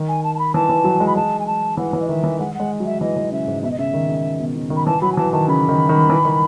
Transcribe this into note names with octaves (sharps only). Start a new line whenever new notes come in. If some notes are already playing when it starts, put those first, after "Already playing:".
Already playing: D#3
G#5
A5
A5
B5
E3 A5
E3
F#3
G#3
B5
G#3 A5
G#5
A5
E3 F#5
E3
D#5
D#3 E5
E3
G#3 F#5
G#3 F#5
F#3
E5
E3 D#5
E3
C#3 E5
G#2
B2 E5
D#5
C#3 E5
D#3
C#3
B2
C#3
D#3
B5
E3 A5
F#3 B5
G#5
E3 A5
D#3 A5
C#3 B5
D#3
D#3
E3
D#3